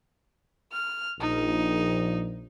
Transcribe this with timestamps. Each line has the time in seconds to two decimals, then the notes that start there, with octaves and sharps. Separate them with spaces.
0.72 F6
1.20 A#1 D#4